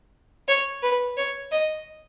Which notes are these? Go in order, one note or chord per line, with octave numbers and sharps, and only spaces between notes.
C#5
B4
C#5
D#5